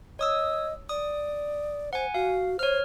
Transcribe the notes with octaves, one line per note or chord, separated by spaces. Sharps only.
C#5 D#5 D#6 E6
D5 D#6
C5 F#5 G#5
F#4 F5
C5 C#5 F6